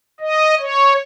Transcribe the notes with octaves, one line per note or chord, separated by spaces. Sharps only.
D#5
C#5